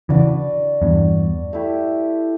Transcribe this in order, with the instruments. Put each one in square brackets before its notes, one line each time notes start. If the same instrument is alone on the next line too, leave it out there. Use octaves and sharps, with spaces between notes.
[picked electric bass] C#3 E3 [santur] D4 F#4 B4 D5
[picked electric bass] E2 G2
[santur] A3 E4 G4